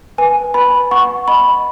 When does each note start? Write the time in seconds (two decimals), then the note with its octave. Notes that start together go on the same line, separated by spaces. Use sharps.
0.18 B4 G#5
0.54 B4 B5
0.91 F#5 C#6
1.28 D#5 B5